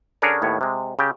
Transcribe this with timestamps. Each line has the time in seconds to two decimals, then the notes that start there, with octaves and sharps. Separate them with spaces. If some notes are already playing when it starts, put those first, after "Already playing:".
0.22 D3 C#4 D4 G#4 A#4 C#5
0.42 D#2 A2 B3 C#5
0.61 C3 G#3
0.99 C#3 G4 G5